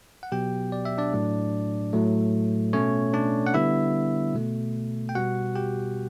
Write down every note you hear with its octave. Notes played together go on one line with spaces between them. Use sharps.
F#5
B2 F#3 B3 G4 G5
D5
E5
D4 D5
A2 F#3 A3
A2 F#3 A3
B2 A3 C#4 C#5
D4 D5
F#5
D3 G3 B3 E4 E5
B2 A3
G5
B2 G3 B3 F#4 F#5
G4 G5